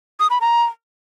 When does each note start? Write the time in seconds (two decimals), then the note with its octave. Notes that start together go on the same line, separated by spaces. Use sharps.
0.20 D#6
0.30 B5
0.41 A#5